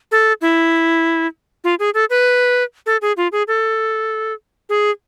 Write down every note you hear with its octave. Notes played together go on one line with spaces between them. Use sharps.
A4
E4
F4
G#4
A4
B4
A4
G#4
F4
G#4
A4
G#4